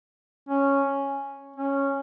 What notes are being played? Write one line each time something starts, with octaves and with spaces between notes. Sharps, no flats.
C#4
C#4